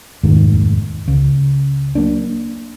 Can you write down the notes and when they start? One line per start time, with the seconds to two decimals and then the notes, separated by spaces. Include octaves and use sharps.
0.23 F1 D#2 G#2 D#3
1.08 C#2
1.95 F#3 A#3 D4